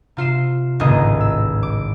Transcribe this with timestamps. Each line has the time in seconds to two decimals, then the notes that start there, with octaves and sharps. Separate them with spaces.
0.17 C3 F4 C7 E7
0.80 G#1 C#2 A2 A#3 D#5
1.20 E6
1.63 D6